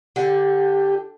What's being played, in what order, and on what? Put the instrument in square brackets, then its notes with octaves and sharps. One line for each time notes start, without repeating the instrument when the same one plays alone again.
[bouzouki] D3 [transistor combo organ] G4